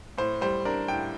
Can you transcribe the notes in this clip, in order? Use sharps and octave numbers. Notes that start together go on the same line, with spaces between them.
A2 C5
G3 C5
D4 A#4
A2 G5